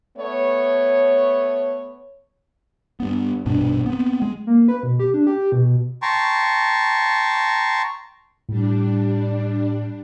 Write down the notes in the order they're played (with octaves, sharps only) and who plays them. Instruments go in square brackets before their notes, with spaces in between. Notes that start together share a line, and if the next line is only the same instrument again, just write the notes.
[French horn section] A3 B3 C#5
[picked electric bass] G2 B3
A#1 G2 B2 D4
B3 C4
G#3
[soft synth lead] A#3
B4
B2
G4
D4
G4
B2
[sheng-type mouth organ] G5 A5 A#5 C6 C#6
[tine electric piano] A2 [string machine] G3 D4